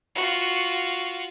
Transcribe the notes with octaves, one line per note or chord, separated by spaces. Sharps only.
F4 F#4